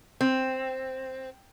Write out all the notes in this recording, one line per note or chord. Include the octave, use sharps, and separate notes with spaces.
C4